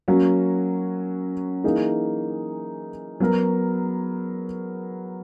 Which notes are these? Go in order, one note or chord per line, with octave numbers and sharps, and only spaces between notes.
F#3 A#3 C#4 F#4
E3 A#3 D#4 G#4
F#3 B3 F#4 A#4